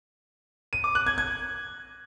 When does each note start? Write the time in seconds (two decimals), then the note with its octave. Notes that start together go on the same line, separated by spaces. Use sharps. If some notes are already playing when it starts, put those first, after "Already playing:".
0.73 D#7
0.84 D6
0.95 F#6
1.07 G#6
1.18 G#6